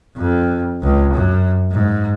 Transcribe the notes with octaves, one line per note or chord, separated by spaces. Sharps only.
F2
C#2
F#2
G#2